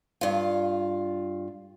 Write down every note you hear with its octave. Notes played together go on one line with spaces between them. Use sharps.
G2 F4